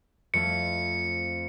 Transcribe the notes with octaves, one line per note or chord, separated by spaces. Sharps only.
F2 A3 C#7